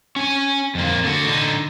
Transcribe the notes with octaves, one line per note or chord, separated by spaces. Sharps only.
C#4 G#5
F2 A#3
D3 F#4
D3 D#4